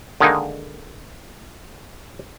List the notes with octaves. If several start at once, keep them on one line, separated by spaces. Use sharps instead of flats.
D3 D#3 G#3 A#3 D#4